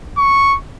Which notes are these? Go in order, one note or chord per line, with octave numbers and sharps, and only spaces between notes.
C#6